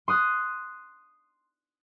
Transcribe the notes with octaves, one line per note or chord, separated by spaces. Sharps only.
C6 D#6 F#6